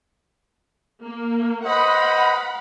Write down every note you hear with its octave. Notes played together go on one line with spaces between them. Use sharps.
A#3
B4 C5 D#5 F#5 B5